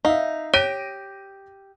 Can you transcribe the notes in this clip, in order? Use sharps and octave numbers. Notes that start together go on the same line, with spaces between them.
D#4 E5 F5
G4 C#5 G6 A#6 D7 D#7